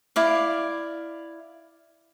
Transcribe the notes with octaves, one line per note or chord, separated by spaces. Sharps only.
E4 D5 F5